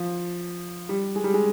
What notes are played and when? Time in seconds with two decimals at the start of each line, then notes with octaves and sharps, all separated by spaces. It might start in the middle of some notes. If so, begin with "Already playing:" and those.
Already playing: F3
0.89 G3
1.16 G#3
1.24 G3
1.34 G#3